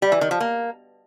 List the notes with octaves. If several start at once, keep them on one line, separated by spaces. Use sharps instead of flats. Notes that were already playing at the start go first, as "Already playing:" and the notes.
G3
E3
D#3
F3
A#3